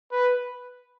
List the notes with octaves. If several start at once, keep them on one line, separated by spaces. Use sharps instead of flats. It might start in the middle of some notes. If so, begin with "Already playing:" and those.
B4